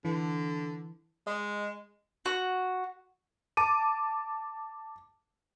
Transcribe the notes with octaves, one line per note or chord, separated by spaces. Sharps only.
D3 E3
G#3 D#5
F#4
A5 D6 D#7